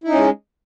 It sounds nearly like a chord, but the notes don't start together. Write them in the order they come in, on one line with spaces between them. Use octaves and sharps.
E4 D#4 C#4 G#3